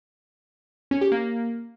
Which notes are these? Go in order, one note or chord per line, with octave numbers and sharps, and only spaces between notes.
C#4
G4
A#3